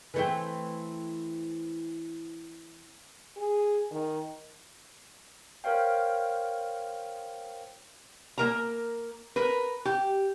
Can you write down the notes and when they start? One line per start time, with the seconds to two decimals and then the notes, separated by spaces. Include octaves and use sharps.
0.14 E3 A3 C4
3.37 G#4
3.91 D#3
5.64 A#4 C5 C#5 F5 G5
8.38 A#3 A#4 A#5
9.36 A#4 B4
9.85 G4